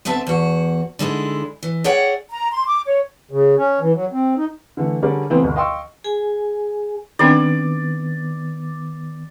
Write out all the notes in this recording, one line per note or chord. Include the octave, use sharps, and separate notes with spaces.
D2 B3 C4 E5 A5
E2 F#4
D3 G#3 D#4 E4
E3
G#4 C#5 D5 E5 F#5 G5
A#5
C6
D6
C#5
C#3
C#4
E3
F#3
C4
D#4
D3 E3 A3
D3 G3 C#4 G#4 A#4 D5
C#3 E3 F#3 A3 B3 C4
G1 D2 B2 F#4
D#5 F5 G5 C6 C#6 E6
G#4 G#5
D#3 B3 C4 D4 D#4 D5